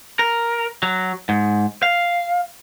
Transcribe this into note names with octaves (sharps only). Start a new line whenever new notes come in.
A#4
F#3
G#2
F5